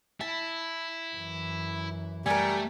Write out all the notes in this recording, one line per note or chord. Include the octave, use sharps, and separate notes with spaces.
E4 A5
F#2 E3
G3 A3 A#4 G#5